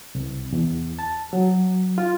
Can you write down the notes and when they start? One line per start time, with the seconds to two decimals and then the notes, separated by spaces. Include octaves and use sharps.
0.15 C2
0.52 E2
0.99 A5
1.33 F#3
1.98 F4